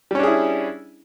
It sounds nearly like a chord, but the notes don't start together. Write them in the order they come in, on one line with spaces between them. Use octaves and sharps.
G3 C#4 D4 G#4 E4